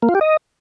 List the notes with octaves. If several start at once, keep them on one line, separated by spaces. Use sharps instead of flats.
A#3
F4
G4
D#5